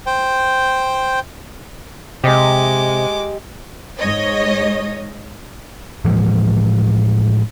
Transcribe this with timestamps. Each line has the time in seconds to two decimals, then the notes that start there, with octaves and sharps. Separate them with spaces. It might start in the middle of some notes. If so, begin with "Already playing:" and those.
0.06 C5 G5
2.24 C3 G#3 G4 D#5 D6
3.98 G#2 C#5 D#5
6.05 A2 E3 F3 G#3